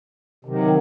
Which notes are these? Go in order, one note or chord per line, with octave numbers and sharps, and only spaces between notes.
C3 D#3 F#3